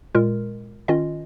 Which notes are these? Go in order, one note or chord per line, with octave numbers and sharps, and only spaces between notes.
A#2 G#3 F4 A#4
D#3 C#4 F4 D#5